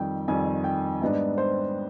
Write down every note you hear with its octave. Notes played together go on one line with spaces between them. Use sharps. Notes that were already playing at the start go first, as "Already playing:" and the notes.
Already playing: F2 D#3 G3 G5
F2 D#3 G3 G#5
G5
G#2 G3 B3 D4 D#5
C5